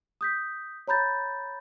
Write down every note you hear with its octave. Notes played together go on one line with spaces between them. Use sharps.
D#6 G6 B6
C#5 A#5 B5 G6 A6